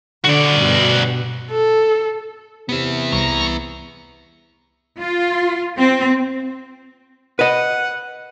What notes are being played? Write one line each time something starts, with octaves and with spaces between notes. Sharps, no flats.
D3 F#4 D5
G2 B2
A4
C3 B3 E4
C2 A#5 C#6
F4
C4
B4 D#5 F#5